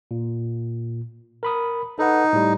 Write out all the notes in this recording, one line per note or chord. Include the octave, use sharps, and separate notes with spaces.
A#2
A#4 B5 D#6
D#4 A4 B4 F#5
A2 G3